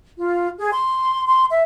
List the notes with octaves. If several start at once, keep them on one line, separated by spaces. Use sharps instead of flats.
F4
G#4
C6
C6
E5